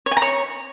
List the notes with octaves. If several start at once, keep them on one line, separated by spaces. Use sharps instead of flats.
C#5
G#5
A#5
C#5